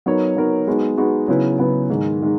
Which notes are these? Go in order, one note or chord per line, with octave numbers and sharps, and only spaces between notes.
F#3 B3 D#4 A#4 C#5
F#3 B3 D#4 A#4 C#5
G#3 B3 D#4 F#4
G#3 B3 D#4 F#4
C#3 F#3 B3 E4 B4
C#3 F#3 B3 E4 B4
G#2 D#3 G#3
D#3 G#3